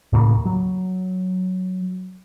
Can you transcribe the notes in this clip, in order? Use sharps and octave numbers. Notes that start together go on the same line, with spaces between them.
D#2 A2 C#3 A#3
F#3